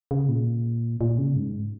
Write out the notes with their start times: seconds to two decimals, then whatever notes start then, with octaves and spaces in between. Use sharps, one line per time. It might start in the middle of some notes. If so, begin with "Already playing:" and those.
0.11 C#3
0.29 A#2
1.01 A#2
1.18 C#3
1.36 G#2